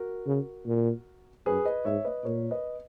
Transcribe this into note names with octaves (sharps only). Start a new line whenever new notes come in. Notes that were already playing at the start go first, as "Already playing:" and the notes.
Already playing: F#4 A#4
C#3
A#2
F#2 G#4 B4
B4 D#5
G#2 C#5 E5
B4 D#5
A#2 A#4 C#5
B4 D#5